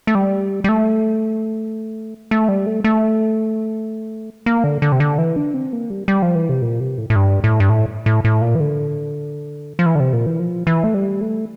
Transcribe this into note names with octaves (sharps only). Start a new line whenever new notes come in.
A3
G3
G3
A3
A3
G3
A3
A3
A#3
D3
D3
C3
D3
E3
D4
C4
A#3
G3
G3
F3
E3
C3
A#2
C3
A2
A2
G2
A2
G2
A2
A2
A2
A#2
E3
D3
F3
E3
D3
C3
A#2
E3
F3
E3
A3
G3
A3